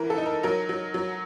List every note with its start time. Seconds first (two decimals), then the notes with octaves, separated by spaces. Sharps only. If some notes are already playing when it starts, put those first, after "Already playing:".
Already playing: E3 A#4
0.10 A4
0.18 D#4
0.26 A#4
0.43 F#3 A#4
0.69 F#3
0.94 F#3